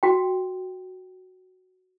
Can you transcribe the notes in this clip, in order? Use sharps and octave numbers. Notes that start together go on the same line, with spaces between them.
F#4 G5